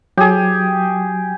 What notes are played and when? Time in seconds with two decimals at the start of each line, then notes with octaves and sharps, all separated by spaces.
0.17 F#3 G4 G#4